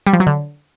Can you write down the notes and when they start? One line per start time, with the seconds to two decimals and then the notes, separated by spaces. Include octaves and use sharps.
0.07 G3
0.13 F3
0.20 F#3
0.27 D3